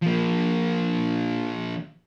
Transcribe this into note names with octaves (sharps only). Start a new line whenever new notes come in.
F3 A#3